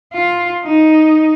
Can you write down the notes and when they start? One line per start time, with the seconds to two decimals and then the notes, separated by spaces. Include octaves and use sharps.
0.13 F4
0.64 D#4